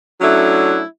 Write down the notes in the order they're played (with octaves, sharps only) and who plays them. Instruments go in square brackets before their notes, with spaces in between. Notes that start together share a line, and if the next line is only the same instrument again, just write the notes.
[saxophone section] F#3 A3 C#4 D4 E4